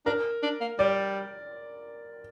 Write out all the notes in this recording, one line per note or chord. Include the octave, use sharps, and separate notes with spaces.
D4 A#4
D4
A#3
G3 D5